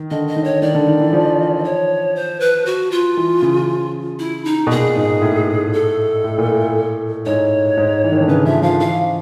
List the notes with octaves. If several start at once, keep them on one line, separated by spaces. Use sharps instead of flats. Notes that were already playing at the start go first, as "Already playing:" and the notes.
Already playing: D#3
D3 D#5
D#5
D#3
C#5
D#3 D5
D3
D#3
E3
F3
C#5
C5
B4
F#4
F4
E3
C#3
E4
D#4
B2
A#2 G#4
G#2
A2
A4
A2
A#2
A2
G#2 C#5
G#2
E3
D#3
D3
C#3 B4
F3 E5
F3 F5
E3 F5